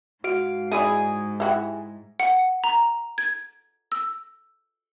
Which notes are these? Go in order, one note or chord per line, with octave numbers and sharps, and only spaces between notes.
G#2 F#4 F5 D7
D#4 E4 G#4 D5
E4 F#4 G4
F#5
A#5
G#6
E6